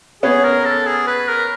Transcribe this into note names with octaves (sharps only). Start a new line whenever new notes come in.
B3 C#4 G#4
A#4
A4
G#4
B4
A#4